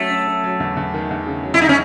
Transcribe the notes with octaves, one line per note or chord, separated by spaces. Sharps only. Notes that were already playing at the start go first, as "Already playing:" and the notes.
Already playing: F#3 A3 C#4
C#4
C#4
F#3
E2
E2
D#3
E2
C#3
F#3
E4
C#3 D#4
C#4